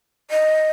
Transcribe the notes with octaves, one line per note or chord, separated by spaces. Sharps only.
D#5